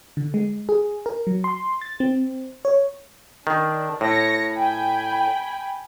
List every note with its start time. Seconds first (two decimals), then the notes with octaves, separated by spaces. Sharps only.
0.17 D3
0.34 G#3
0.69 G#4
1.06 A#4
1.27 F#3
1.44 C6
1.81 A6
2.00 C4
2.65 C#5
3.47 D#3 D4
4.01 A2 C#5 A#6 C#7
4.53 G5 G#5 B5